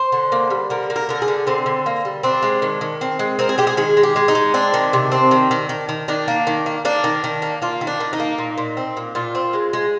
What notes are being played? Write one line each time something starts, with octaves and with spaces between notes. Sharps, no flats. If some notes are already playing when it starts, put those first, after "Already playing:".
Already playing: C5
D3
A#3
G3
D3 A#4
A#3
A#4
D3 A#4
G#4
D3
D3 C4
D3
A#3
G3
C4 D4
G#3
D#3
D#3
C4
G#3
C4 A#4
G#4
G#3 G4
G#4
D#3 G#4
G#3
G4
G#3
D#4
G#3
C4 D4
D#3
C3
C4
D#3
D#3
D#3
D#3
D#3 D4
A#3
D#3
A#3
A#3 D4
D#3
D#3
A#3
A#3 F4
D#3
D4
D#3
D#4
A#3
A#2
A#2
C4
A#2
A#2 F4
C4
G#3
G#3